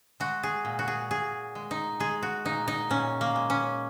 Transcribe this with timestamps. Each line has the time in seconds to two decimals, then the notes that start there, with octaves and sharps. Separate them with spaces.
0.20 G#3 F#4
0.43 G#4
0.65 A#2
0.79 F#4
0.88 G#4
1.11 A#2 G#4
1.55 G#3
1.71 D#4
2.00 G#3 G#4
2.23 F#4
2.45 A#2 D#4
2.68 D#4
2.90 A#2 C#4
3.21 A#3
3.36 G#3
3.50 C#4